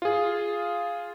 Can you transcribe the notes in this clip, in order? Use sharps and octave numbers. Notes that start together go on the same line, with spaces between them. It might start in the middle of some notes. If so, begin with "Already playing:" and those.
F4 G#4